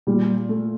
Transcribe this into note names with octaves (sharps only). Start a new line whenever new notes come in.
A#2 G3
A3